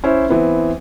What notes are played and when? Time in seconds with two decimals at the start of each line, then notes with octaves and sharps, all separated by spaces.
0.04 C#4 E4 C5
0.29 E3 B3 C4